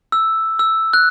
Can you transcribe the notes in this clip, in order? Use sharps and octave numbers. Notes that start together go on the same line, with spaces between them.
E6
E6
F#6